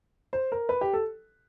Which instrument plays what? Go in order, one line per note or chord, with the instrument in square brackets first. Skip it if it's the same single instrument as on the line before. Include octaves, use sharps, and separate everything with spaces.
[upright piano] C5
A#4
B4
G4
A4